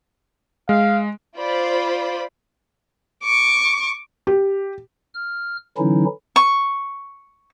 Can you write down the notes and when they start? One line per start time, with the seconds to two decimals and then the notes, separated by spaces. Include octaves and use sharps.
0.69 G#3 F5
1.38 F4 C5 D5 B5
3.24 C#6 D6
4.27 G4
5.14 F6
5.78 D3 E3 F#3 C#4 D#4 E4
6.36 C#6